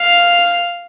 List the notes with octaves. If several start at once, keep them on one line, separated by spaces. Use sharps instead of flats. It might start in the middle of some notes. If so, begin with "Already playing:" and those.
Already playing: F5